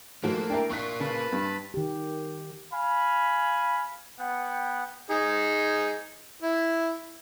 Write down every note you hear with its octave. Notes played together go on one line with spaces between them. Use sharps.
G#2 F3 A3 A#3 F#4
D4 E4 A#4 G5
A#3 F4 C#6 F#6 B6
C#3 B4 A5 B5
G2
D#3 G4
F5 G#5 B5
B3 F#5 G5
D#4 G#4
E4